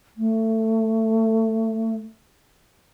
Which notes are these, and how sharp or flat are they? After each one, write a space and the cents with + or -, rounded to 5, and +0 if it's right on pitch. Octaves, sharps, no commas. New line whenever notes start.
A3 +20